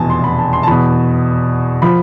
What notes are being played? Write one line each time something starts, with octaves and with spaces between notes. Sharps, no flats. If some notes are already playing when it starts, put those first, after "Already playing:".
Already playing: F1 E2 B2 G#5 A5
C6
B5
A5
C6
A5
E2 B2 B5
F3 B5